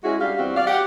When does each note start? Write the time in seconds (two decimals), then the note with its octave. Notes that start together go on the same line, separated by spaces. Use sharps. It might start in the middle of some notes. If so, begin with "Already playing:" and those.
0.04 G#3 C#4 E4 F#4 G#4
0.21 G3 D4 G4 F5
0.39 E2 G3 C4 F#4
0.56 D5 F5
0.67 G4 F#5